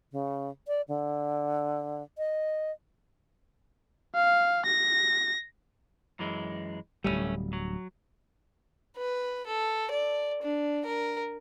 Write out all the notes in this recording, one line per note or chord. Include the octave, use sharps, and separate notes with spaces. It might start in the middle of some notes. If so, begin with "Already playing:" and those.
C#3
D5
D3
D#5
F5
A#6
F#2 E3 G#3
D1 C#2 G3 A3 C#4
F#3
B4
A4
D5
D4
A#4